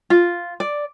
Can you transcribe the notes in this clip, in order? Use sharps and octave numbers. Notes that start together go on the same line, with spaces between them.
F4
D5